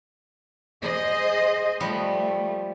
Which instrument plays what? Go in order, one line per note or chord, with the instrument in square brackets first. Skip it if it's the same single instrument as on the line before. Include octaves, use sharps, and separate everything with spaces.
[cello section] G#4 C5 D#5
[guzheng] F3 G3 B3 [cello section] A3